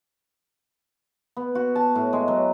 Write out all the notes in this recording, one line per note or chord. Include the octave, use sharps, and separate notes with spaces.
B3
F#4
A5
A2
G#3
F#3